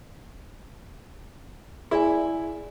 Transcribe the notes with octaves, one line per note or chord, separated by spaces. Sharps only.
E4 G#4 D5 G#5